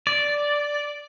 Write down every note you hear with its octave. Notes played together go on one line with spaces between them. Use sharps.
D5